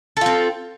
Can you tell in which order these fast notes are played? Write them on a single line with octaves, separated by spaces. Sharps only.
A4 F4 C4